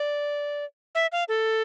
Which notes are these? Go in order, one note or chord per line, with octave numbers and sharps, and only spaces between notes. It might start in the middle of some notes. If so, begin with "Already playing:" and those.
Already playing: D5
E5
F5
A4